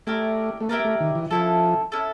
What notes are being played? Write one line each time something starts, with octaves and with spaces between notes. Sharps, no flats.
A3 E4 G4 A#4 D5
A3
A#3 E4 G4 A#4 D5
A3
D#3
E3
F3 C#4 E4 A4
C#4 E4 A4